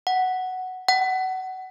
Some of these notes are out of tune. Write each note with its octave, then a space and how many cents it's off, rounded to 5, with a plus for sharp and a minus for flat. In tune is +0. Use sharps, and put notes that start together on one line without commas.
F#5 +5
F#5 +25